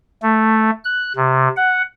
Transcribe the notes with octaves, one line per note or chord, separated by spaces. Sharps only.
A3
F#6
C3
F#5